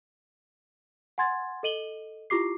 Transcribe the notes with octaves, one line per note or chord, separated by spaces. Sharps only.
F#5 G#5 C6 G#6 A6
A4 D#5 D#7 F#7 G7
E4 F4 G4 D6 C7